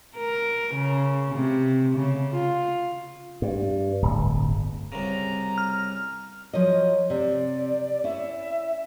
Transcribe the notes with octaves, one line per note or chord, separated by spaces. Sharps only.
A#4
C#3
C3
C#3
F4
G2
D1 G1
C2 C#3 A#5
F6
F3 F#3 C#5 D#5
C3 D5
C#4 E4 E5